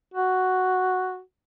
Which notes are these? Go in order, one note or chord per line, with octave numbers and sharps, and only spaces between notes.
F#4